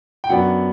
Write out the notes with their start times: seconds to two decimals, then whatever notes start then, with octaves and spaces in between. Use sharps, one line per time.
0.24 G5
0.30 F#2 F#3 B3 D4 F#5